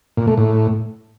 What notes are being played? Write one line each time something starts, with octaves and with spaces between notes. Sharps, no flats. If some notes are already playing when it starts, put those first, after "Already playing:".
A#2
A3
A2